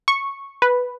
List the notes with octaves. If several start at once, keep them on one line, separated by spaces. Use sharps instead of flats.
C#6
B4